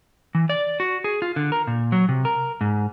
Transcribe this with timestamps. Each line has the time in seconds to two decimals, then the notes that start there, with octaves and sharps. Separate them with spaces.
0.35 E3
0.49 D5
0.80 F#4
1.04 G#4
1.22 F4
1.36 D3
1.52 A#4
1.67 A#2
1.92 F#3
2.09 C3
2.25 A#4
2.61 G#2